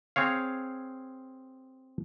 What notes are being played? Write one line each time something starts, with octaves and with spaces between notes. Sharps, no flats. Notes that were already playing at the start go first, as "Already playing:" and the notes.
C4 G#4 C#5 F5